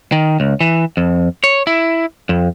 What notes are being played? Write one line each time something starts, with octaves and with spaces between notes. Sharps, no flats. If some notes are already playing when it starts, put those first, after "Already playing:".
D#3
C#2
E3
F2
C#5
E4
F2